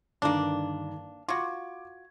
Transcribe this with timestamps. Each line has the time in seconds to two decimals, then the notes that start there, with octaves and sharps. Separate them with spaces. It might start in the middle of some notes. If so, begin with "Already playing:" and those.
0.22 G2 D3 D#3 A#3 D4
1.29 F4 F#4 D6 G#6